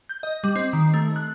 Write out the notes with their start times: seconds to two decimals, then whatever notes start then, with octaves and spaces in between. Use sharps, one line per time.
0.09 G6
0.23 D#5
0.44 G3
0.56 C4
0.73 D#3
0.94 A3
1.16 F#6